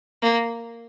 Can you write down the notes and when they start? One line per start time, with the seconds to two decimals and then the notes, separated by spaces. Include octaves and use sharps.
0.22 A#3